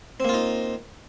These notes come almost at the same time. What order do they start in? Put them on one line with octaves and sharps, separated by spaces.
C4 A#3 F4 D#4